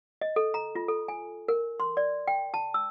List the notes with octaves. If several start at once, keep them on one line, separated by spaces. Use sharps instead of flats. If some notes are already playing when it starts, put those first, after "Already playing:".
D#5
A4
A#5
F4
A4
G#5
A#4
C6
D5
G5
A5
E6